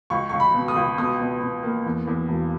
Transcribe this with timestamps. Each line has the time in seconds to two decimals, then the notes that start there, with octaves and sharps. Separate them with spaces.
0.10 C#2 C#6
0.29 C#2 C#6
0.40 B5
0.54 B2
0.68 D#6
0.76 C#2
0.98 B2 D#6
1.20 B2
1.41 B2
1.63 A#3
1.86 E2
2.07 E2
2.28 E1